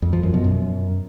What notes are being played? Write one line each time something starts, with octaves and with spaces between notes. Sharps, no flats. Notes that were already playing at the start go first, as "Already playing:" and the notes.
F2
F3
F#2
B2
F#2